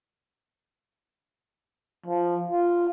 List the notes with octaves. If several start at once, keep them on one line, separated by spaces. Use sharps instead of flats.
F3
F4